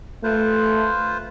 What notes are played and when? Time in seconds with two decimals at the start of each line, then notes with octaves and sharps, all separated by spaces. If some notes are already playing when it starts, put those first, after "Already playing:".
0.24 A3 F4 B4 C5